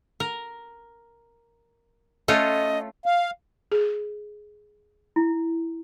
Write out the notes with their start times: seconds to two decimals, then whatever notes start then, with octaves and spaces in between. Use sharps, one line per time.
0.20 A#4
2.28 A3 C#4 F4 D#5
3.06 F5
3.72 G#4
5.16 E4